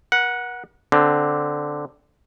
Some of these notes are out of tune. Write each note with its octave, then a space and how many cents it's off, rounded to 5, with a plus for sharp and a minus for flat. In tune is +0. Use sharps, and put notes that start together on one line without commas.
A#4 +45 F#5 -5
D3 +0 C4 +0